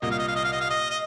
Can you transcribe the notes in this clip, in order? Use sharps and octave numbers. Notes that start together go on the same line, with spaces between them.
C2 A#2 A#3 D#5
F5
D#5
F5
D#5
F5
D#5
F5
D#5
D#5